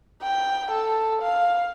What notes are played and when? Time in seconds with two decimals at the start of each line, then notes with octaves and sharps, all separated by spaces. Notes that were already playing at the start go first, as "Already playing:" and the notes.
0.22 G5
0.72 A4
1.22 F5